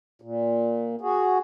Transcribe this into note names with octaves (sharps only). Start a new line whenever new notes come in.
A#2
F#4 G#4